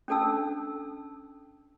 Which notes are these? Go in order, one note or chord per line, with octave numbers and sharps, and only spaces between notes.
C#4 D4 A4 A5 E6